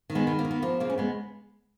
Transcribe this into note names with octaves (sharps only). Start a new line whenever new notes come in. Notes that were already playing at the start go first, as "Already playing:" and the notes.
D#3
G#3 B3
D#3
A#3
D#3
B3
F3 A#3
C#3 A#3
C#4
G#3 B3